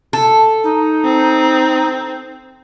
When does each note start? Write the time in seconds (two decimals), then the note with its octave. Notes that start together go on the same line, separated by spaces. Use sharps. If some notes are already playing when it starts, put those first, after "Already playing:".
0.13 A4
0.64 D#4
1.05 C4